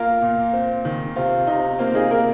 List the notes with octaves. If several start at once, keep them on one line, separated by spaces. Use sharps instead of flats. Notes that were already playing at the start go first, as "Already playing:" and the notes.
Already playing: A#3 F4 A#4
A#2
C4
D#3
C3 C4 F4
C3 D#4
A#3 C4 F4
D#4 G#4
A#3 F4 A#4